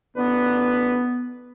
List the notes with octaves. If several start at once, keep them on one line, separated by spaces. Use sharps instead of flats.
A1 B3 D4 B4